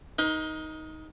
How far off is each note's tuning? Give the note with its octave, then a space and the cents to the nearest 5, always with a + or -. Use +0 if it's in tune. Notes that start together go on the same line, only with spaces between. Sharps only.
D#4 +10 A#4 +40 C6 +0